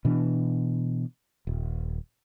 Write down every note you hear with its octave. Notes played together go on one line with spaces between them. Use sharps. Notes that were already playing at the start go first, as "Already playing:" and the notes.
B2 E3 D4
D#1